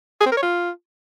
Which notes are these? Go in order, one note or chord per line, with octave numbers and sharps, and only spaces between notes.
G#4
C4
A#4
C#5
F4